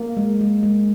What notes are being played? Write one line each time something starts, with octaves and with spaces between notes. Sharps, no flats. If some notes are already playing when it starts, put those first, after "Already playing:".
Already playing: A#3
G#3
G#3
G#3